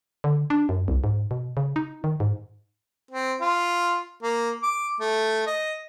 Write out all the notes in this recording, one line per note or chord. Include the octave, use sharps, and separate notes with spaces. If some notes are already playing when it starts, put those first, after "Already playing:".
D3
D4
F#2
C2
G#2
B2
C#3
D#4
D#3
G#2
C4
F4
A#3
D6
A3
D#5